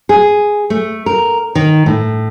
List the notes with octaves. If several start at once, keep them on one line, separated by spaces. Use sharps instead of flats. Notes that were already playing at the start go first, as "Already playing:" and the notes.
G#4
A3
A#4
D#3
A2